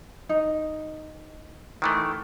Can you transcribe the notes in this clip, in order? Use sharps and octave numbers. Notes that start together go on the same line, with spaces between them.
D#4
D#3 E3 A3